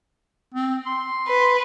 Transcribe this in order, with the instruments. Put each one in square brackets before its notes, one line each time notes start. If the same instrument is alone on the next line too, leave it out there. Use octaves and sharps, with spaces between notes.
[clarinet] C4
C6
[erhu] B4